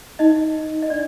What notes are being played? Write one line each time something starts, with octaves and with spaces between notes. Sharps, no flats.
D#4 D#5
D#5
D4 D5